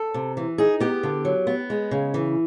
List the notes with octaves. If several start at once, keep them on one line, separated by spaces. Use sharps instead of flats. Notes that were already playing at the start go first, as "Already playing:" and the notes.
Already playing: A4
C3
E3
D#4 G#4
B3 G4
D3
F#3
B3
G#3
C#3
E3